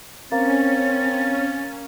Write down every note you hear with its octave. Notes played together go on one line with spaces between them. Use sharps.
A#3 C4 C#4 A6